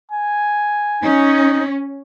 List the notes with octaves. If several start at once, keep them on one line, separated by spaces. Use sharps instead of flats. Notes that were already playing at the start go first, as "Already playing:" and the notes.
G#5
C#4 D#4